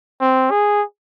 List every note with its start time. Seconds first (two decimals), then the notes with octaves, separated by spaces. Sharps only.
0.21 C4
0.51 G#4